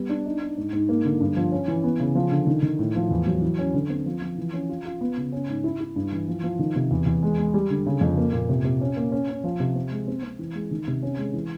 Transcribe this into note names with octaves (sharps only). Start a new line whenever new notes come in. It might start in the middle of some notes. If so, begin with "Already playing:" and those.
Already playing: G3 B3
D4
D#4
D#4
G#2
G#2
A#3
D3
G2
F3
C#4
E3
B3
C#3
F3
D3
D#3
D#3
A2
F3
E2
F#3
E3
C#4
D3
C4
F3
F3
E3
C#4
F4
F4
B3
C#3
C#4
G#2
E4
E4
G2
E3
F3
F3
D#3
C3
E2
E2
G#3
G#3
G3
D3
C#3
F2
A#3
A#2
C3
C3
C#4
A#3
C#4
C#4
F3
C3
C4
G#3
C4
C4
E3
G#3
D#3
C3
C#4
G#3
E3